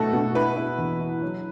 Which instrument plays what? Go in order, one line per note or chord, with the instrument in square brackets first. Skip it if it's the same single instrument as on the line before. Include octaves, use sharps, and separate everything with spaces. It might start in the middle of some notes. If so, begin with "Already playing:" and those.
Already playing: [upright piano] B2 F#3 A3 [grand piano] F#4 A4
[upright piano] B2
[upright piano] E4 [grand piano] B4
[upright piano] E4
E2
E4
F#3